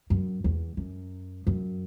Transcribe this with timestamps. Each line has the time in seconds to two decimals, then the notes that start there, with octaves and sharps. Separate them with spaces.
0.10 F#2
0.44 E2
0.77 F#2
1.47 F#2